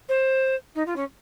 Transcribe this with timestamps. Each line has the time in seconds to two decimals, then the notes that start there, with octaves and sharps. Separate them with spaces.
0.09 C5
0.75 D#4
0.86 F4
0.96 C#4